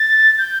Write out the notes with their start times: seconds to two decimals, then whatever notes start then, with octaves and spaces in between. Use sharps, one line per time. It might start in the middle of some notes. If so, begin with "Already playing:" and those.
Already playing: A6
0.39 G6